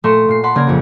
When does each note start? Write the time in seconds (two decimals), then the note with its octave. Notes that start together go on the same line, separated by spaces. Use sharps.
0.04 A#2 A3 A#5 C6 C#6 E7
0.28 A#2 C7
0.43 F#5 A5 B5 C6
0.55 C#3 A#3 D5 A#5 G#6
0.67 A#1 F2